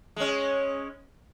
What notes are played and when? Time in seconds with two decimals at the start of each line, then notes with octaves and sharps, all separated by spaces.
0.16 G#3 C#4